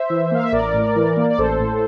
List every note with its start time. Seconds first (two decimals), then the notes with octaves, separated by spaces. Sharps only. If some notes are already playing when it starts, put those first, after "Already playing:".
Already playing: C5 E5
0.10 E3
0.31 A#3 F5
0.43 E5
0.52 A1 A#4 D5
0.74 A2
0.95 E3
1.17 A#3
1.30 D5
1.38 A1 A4 C5
1.60 A2